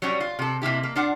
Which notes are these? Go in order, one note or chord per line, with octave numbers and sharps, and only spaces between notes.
F#3 G3 C#4 C#5 G5
F4
C3 A4
C3 A#3 E4 G4
A#3
D4 F4 F#5